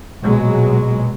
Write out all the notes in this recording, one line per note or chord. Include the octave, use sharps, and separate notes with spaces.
A#1 B2 F#3 G#3